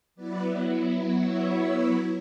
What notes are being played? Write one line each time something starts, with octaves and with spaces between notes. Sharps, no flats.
F#3 B3 E4 B4 D5
C#5 E5